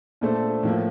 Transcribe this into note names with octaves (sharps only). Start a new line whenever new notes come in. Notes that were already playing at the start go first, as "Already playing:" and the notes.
A#2 A3 D4 A4 C5
A2 F3 A#3